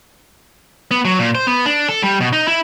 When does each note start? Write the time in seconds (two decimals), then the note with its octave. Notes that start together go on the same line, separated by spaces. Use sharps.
0.91 B3
1.05 F#3
1.19 A#2
1.35 C5
1.47 B3
1.66 D4
1.89 A4
2.03 G3
2.21 B2
2.33 D#4
2.48 E4